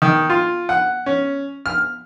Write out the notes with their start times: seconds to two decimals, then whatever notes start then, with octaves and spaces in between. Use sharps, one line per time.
0.02 D#3
0.30 F4
0.69 F#5
1.06 C#4
1.66 F6